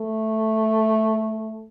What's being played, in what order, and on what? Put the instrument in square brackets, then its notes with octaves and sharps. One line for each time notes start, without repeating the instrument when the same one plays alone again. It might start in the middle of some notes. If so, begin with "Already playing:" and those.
Already playing: [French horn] A3